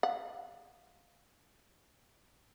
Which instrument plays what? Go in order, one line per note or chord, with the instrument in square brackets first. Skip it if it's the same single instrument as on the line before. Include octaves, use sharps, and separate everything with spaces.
[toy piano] F5 [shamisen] F#5